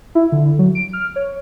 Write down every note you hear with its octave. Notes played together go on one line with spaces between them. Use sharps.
E4
D3
F#3
D7
F6
C#5